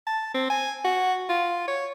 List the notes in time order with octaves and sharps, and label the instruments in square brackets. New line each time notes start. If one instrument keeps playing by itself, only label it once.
[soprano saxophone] A5
C4
G#5
F#4
F4
C#5